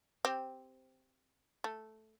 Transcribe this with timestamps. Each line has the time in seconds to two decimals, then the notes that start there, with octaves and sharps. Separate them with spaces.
0.25 C4 G4
1.64 A3